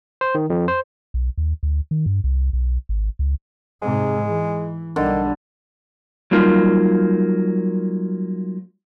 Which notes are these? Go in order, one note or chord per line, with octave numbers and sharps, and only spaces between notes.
C5
D#3
F2
C5
B1
D#2
D2
D#3
G2
C2
B1
G#1
C#2
G#2 C3 G#3
E3
B1 D3 D#3 G3
F#3 G3 A#3 D#4 F4